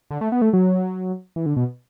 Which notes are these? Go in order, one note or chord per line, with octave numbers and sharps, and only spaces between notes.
D3
A3
B3
A3
F#3
E3
D3
B2